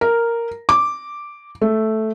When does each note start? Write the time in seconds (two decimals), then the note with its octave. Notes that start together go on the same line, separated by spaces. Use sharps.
0.01 A#4
0.69 D6
1.62 A3